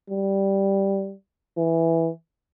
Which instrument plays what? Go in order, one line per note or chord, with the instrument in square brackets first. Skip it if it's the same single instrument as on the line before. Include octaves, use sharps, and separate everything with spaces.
[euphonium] G3
E3